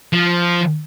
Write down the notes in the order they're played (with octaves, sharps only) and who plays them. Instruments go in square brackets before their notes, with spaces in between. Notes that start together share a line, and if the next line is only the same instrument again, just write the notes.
[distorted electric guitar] F3